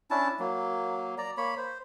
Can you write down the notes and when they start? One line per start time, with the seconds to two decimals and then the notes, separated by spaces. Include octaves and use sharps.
0.11 C#4 D4 E4 A5
0.39 F#3 A#3
1.18 D5 A#5
1.37 A#3 C#5 B5
1.57 C5